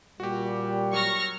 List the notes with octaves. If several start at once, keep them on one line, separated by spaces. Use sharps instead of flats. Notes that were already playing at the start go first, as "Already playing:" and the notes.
A#2 G3 F#4 G4
F#3 C#6 F6 A#6